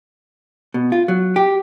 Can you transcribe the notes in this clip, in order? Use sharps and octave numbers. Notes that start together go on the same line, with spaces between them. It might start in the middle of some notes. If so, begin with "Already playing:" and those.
B2
F4
F#3
G4